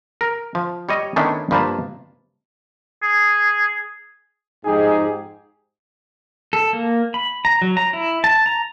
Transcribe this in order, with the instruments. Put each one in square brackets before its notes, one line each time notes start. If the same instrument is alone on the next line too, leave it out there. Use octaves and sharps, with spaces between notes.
[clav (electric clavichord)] A#4
F3
G3 C#5 D#5
D#3 A3 B3 C#4 D4 E4
G2 F3 A#3 B4 C5 A5
[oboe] G#4
[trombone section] F2 G4 G#4 [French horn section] G#2 D#4
[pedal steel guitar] A4
A#3
B5
A#5
F#3
A#5
E4
A5
A#5